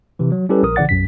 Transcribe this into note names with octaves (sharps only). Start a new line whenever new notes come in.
C3 E3
F#3
G3 C#4 E4 G4 A4 B4
A#1 A#4 D#6
A1 C#3 E3 D5 F#5 A6
B1 F#2 B6